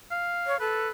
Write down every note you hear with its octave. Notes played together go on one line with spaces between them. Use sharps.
F5
C#5
A4 B4